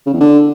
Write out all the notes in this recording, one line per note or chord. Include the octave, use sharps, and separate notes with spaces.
C#3
E2
D3